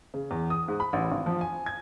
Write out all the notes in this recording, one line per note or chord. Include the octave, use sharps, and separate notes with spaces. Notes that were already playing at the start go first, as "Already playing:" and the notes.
C#3
E2
D#6
G#2
B5
A1
G#1
F3
G#5
G#6